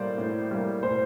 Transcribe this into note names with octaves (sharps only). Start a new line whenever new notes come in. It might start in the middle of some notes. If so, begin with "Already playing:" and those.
Already playing: A2 G3 A#3 C5 D5
A2
G3 A#3
A2 C5